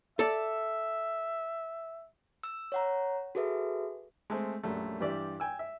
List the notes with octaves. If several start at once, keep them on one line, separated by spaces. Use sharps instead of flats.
A4 D5 E5
E6
C#5 F#5 A#5
F#4 G#4 A4 B4 E5
G#3 A3 C4
A#1 F#2 G3 A3
G2 E3 G4 D5 E5 D6
G5 G#5 E6
E5